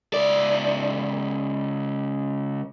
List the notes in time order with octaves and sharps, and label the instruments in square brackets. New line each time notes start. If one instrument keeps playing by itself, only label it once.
[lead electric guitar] C#2 D5